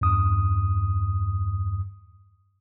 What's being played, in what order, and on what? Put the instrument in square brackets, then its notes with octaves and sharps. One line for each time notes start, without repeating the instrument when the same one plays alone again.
[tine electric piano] E2 G2 D#6